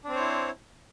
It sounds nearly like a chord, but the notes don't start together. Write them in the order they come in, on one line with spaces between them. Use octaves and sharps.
D4 C4 C5 C#5 E4